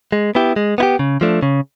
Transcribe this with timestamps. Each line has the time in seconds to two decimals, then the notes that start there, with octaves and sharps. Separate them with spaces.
0.12 G#3
0.35 B3 E4 G4
0.56 G#3
0.78 B3 E4
0.83 G4
0.99 C#3
1.21 F3 A3 D4
1.42 C#3